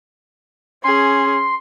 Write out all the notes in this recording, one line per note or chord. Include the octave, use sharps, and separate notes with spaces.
C#4 G#4 C6